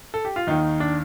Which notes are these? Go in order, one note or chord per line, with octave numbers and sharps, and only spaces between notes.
A4
G4
F4
D#2 D#3 D#4
D4